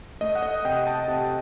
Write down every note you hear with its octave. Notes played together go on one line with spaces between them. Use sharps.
A3 D#5
F#5
D#5
C3 G5
A5
C3